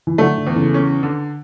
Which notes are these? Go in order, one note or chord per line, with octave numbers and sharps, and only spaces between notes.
E3
D3 F#3 A3
D3
E2
C#3 E3
C#4
D3